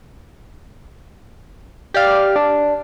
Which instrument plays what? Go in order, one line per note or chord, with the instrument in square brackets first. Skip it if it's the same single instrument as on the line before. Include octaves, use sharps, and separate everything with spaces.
[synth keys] G4 D5 F5
D4